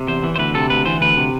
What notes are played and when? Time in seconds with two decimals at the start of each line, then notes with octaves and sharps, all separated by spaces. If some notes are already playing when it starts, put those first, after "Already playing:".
Already playing: C3
0.08 E2 C5
0.23 E3
0.36 C5
0.39 D2 B4
0.55 C3 A4
0.70 D2 B4
0.86 E3 C5
1.01 D2 B4
1.17 C3